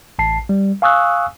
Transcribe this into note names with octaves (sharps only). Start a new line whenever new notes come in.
A1 A5 C7
G3
F5 G#5 C#6 D#6 E6 F#6